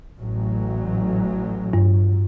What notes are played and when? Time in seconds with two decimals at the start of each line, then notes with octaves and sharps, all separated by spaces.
0.20 A1 A2 F#3
1.73 G2